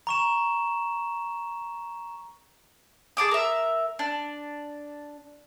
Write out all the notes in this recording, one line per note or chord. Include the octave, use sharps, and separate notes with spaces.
A#5 C#6 E7
G#4 A5 D6 D#6
A#4 E5
D4